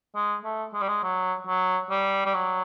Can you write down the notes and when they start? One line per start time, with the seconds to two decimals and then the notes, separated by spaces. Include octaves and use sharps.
0.15 G#3
0.44 A3
0.74 G#3
0.81 G3
0.88 G#3
1.03 F#3
1.47 F#3
1.91 G3
2.25 G3
2.34 F#3